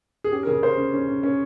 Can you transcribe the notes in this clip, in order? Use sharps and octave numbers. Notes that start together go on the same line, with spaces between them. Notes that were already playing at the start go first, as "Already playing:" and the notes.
G#4
C#4 G4
A#4
C#3 G#4
C#4 C5
C#4
C#4
C#4
C#4